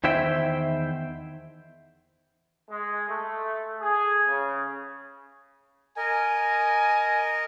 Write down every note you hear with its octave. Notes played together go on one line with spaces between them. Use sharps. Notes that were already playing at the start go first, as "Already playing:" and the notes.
E2 D#3 E4 C5 E5 G5
G#3
A3
G#4
C#3
A#4 D#5 G#5